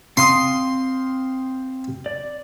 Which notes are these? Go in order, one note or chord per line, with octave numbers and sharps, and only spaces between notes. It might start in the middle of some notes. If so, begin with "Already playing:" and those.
C4 F5 C6 D#6
D5